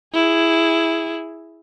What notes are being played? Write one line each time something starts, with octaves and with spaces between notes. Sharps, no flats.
E4 G#4